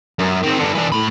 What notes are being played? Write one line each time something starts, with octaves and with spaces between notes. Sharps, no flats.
F#2
D#3 C4
G2 D3
E3 D4
A2 B5